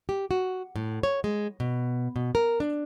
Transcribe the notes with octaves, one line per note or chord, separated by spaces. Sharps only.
G4
F#4
A2
C#5
G#3
B2
B2
A#4
D4